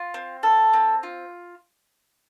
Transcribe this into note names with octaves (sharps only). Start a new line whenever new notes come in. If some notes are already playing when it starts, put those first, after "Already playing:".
Already playing: F4
C4
A4
C4
F4